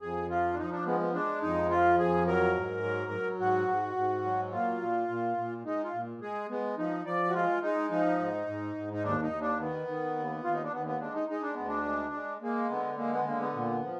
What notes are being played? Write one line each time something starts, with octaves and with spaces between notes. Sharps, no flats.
F2 G#4
F3 F4
D4
F3 D#4
D4
G#3 B3
B3
G#3 D4
F2 D#4
F3 F4
F2 G#4
F#3 A#4
G#2
F#3
F#3
G#2 F#4
G#2
G#2
F#3
A#2 F4
A#2
A#2
A#2
G#3 D#4
F4
A#2
G#3 G#4
G#3 B3
F3 D#4
F3 D5
F#4
G#3 F4
G#3 D#4
F3 D#4
G#2
G#2
G#2
D#4
D#2 D4
D#4
D#2
D4
D#3 B3
D#3
D#2
D#2 F4
D#4
D4
D#2 B3
B3
G#3 D4
D#4
G#3 D#4
D4
D2 B3
D4
G#3
G#3
G#3 A#3
D3 B3
G#3 A#3
B3
D3 A#3
B3
A#2
F3